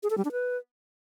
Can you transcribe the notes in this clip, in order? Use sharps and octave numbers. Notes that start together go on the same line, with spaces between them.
G#4
A4
G3
D4
B4